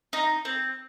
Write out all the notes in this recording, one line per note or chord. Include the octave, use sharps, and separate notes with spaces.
D#4
C4